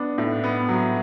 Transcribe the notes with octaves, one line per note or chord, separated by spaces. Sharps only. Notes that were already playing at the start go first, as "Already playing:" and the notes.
Already playing: B3 D4
A2
B3
F#3